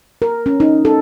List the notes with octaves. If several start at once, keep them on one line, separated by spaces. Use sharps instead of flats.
A#4
C#4
D#4
A4